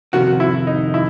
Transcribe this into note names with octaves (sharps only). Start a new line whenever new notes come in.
F2 C3 D#3 F#4
E4
D#4
E4